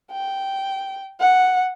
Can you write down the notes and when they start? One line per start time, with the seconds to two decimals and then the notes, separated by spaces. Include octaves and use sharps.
0.11 G5
1.20 F#5